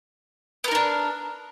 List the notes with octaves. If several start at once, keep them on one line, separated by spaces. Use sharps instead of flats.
B3 D4 D#4 A#4